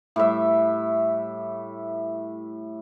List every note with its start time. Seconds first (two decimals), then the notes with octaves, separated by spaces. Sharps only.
0.16 A2 G3 E5